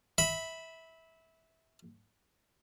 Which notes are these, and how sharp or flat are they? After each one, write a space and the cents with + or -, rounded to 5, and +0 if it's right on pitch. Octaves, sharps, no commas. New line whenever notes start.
E5 -20 B5 +0